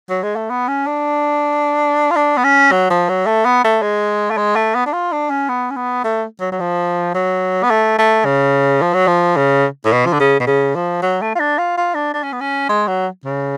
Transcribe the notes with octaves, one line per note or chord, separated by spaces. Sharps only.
F#3
G#3
A3
B3
C#4
D4
F4
D4
B3
C#4
F#3
F3
F#3
A3
B3
A3
G#3
A3
G#3
A3
B3
D4
F4
D4
C#4
B3
C#4
B3
A3
F#3
F#3
F3
F#3
B3
A3
A3
C#3
F3
F#3
F3
C#3
A2
B2
F3
D3
C#3
B2
C#3
F3
F#3
A3
F4
D4
F4
F4
D4
D4
C#4
B3
C#4
G#3
F#3
C#3